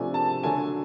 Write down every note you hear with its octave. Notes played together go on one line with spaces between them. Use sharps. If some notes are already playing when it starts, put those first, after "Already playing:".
Already playing: C3 F3 A3 D4 G#5
A5
D3 F#3 A3 G#5